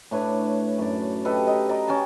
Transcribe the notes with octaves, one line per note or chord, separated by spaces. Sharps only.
A2 D4 B4 C#5
F#2 D5
G4 A4 B4 D#5
D#4 D#5
B4 D5 D#5 A#5
C#4 G5 A5 C#6